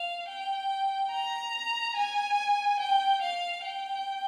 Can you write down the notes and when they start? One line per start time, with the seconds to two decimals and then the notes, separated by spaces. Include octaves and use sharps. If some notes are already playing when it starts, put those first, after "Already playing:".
Already playing: F5
0.28 G5
1.11 A#5
1.96 G#5
2.79 G5
3.21 F5
3.64 G5